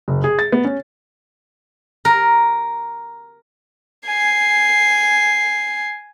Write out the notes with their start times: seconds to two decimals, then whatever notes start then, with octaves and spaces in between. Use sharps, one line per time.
0.08 F#1
0.24 G#4
0.39 A6
0.52 B3
0.64 C#4
2.05 A#4
4.06 G#5 C7